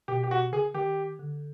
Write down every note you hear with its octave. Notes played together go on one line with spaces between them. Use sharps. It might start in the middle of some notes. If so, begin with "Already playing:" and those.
B2 G4
G4
B2 F#4
C#3 G#4
D#3 G4
D3